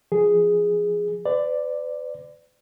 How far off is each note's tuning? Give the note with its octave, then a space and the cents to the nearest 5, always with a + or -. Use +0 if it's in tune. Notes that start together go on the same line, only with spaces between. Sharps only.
F3 +0 G#4 +0
B4 +45 D5 +5